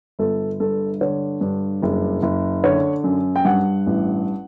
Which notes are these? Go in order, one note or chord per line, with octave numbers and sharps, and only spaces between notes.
G1 A4
G2 A4
D3 C#5
G2
F#1
F#1
D3 C#5
F#2
G5
G2 F#5
A1